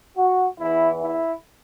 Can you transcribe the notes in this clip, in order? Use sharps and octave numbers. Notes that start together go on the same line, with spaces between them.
F#4
E2 E3 E4
E4